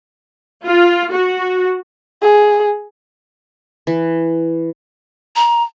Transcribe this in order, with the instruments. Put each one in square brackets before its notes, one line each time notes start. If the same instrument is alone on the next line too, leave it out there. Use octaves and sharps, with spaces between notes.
[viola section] F4
F#4
[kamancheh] G#4
[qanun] E3
[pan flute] A#5